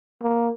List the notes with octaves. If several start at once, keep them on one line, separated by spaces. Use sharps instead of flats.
A#3